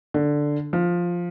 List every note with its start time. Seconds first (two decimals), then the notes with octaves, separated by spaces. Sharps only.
0.14 D3
0.73 F3